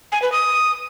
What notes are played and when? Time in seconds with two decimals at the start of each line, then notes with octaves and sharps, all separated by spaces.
0.12 G#5
0.22 B4
0.32 D#6